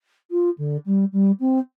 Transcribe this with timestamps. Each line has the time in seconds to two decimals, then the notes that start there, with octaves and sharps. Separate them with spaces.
0.31 F4
0.58 D3
0.86 G3
1.12 G3
1.40 C4